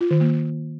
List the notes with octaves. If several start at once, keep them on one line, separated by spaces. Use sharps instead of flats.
F4
D#3
A#3